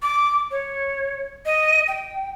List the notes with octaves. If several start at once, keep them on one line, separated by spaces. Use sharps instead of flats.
D6
C#5
D#5
G5